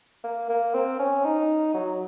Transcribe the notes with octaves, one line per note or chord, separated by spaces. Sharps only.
A#3
A#3
C4
C#4
D#4
F#3